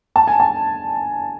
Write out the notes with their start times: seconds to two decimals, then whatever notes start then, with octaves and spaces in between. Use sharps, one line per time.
0.16 A5
0.28 G#5
0.40 A5